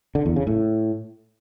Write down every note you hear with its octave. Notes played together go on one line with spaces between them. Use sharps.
D3
E2
C#3
A2